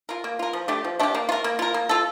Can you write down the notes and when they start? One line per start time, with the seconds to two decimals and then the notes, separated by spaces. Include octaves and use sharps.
0.09 F4 A#4
0.24 A#3
0.39 F4 A#4
0.53 F3
0.68 A3 D4 G4
0.85 F3
0.99 A3 D4 G4
1.15 A#3
1.29 F4
1.32 A#4
1.44 A#3
1.59 F4 A#4
1.74 A#3
1.89 F4 A4